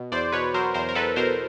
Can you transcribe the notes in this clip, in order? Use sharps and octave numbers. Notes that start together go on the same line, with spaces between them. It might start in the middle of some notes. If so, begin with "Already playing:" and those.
Already playing: B2
E2 C5 D5
B2 B4 C#5
F#3 A#4 C5
E2 A#4 C5
A#4
E2 A4 B4
B2 A#4 C5